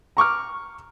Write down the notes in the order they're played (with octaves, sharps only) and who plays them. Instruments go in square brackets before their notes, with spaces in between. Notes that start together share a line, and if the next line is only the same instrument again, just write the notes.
[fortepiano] A#5 C#6 D6 F6